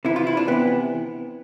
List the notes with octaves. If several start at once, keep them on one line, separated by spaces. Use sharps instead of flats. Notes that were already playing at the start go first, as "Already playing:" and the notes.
C3 E3 E4
F4
E4
D4
C3 E3 B3